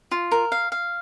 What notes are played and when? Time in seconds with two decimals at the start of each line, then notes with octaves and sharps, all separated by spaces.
0.11 F4
0.32 A#4
0.52 F5
0.72 F5